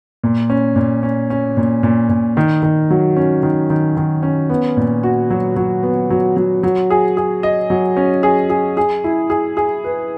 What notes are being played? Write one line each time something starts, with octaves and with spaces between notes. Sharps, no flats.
A#2
C#4
A#2
C#4
C#4
A#2
A#2
A#2
D#3
D#3
F#3
C#4
D#3
D#3
D#3
C#4
B3
A#2
F#4
F#3
F#3
B3
F#3
F#3
F#3
G#4
G#4
D#5
F#3
C#4
G#4
G#4
G#4
E4
G#4
G#4
B4